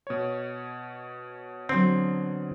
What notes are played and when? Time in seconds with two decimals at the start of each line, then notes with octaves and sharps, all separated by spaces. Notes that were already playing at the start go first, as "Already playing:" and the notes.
0.07 B2 C#5
1.69 D3 F#3 C4